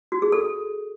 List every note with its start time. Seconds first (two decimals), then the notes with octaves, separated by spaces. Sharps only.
0.12 F#4
0.22 G#4
0.32 A4